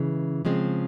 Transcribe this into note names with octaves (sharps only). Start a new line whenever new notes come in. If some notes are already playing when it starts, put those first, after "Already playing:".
Already playing: C#3 E3 G#3
C#3 F3 G#3 C4